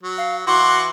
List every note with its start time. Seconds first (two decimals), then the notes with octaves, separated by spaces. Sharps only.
0.03 F#3
0.17 F5
0.47 E3 F#4 C6 D6